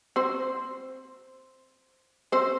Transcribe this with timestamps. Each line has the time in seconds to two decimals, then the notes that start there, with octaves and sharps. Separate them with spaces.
0.16 C4 C5
2.32 C4 C5